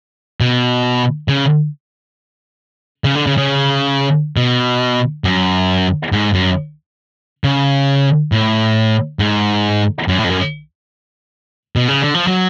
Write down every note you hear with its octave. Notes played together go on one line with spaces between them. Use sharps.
B2
C#3
C#3
D3
C#3
C#3
B2
F#2
G#2
F#2
C#3
A2
G#2
F#2
A2
F2
F#2
B2
C#3
D3
F3
F#3